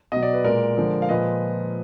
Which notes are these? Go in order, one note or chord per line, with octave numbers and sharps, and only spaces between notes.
B2 F#3 D#5
D5
B4
A#2 G#3 A#4 D5
D3 F3 G#3
F5
A#2 F3 G#3 B4 D#5